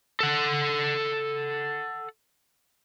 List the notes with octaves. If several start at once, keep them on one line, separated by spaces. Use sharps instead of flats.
A4 F#5